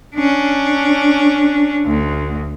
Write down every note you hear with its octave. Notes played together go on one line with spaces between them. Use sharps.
C#4 D4
D2